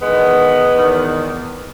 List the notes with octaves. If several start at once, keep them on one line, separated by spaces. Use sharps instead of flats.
E2 D#3 G#3 B3
E2 D#3